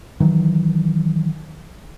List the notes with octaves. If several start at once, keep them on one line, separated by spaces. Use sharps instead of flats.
D#3 E3 F#3